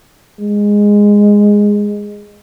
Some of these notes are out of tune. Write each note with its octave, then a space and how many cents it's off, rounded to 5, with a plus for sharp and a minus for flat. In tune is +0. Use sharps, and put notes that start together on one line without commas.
G#3 -10